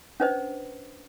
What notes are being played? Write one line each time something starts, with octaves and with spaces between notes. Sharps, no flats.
C#4 D4 B4 C5 D#5